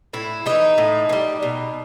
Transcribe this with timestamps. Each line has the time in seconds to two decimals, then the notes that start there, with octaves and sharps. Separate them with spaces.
0.13 A2 E4
0.46 E3 G3 D#4
0.78 A2
1.09 E3
1.13 G3
1.42 B2